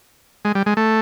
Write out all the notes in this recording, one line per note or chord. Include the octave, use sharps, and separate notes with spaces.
G#3
G3
G#3
A3